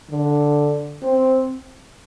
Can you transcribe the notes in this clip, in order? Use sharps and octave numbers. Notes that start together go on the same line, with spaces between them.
D3
C4